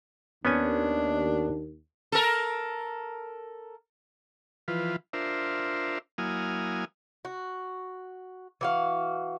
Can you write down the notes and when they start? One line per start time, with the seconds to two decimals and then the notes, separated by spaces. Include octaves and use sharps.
0.45 D#2 B3 C#4 D4 G#5
2.12 A4 A#4
4.68 E3 F3 F4 B4
5.13 D4 F4 A#4 C5 E5
6.18 F#3 A#3 E4 G#5 D#6 F6
7.25 F#4
8.61 E3 F#4 F5